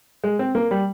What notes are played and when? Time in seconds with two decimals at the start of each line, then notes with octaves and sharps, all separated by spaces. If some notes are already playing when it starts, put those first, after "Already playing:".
0.24 G#3
0.39 C4
0.55 A#3
0.71 G3